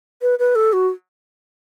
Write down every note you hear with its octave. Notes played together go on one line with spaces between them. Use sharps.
B4
B4
A4
F#4